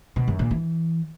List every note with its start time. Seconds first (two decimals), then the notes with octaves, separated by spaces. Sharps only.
0.16 B2
0.28 F#2
0.39 A#2
0.51 E3